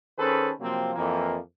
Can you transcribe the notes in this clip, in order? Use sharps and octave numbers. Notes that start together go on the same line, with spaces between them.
D#3 C#4 G#4 A4 B4 C5
C3 F3 F#3 A#3 C4
F2 E3 A#3